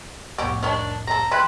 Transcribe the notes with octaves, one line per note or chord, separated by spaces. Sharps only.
C2 F2 A2 B3 C#4 G4
D#3 D4 C#5
C4 A4 A#5
E4 B4 G5 C6 F#6